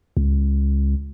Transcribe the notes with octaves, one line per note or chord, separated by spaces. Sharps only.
C#2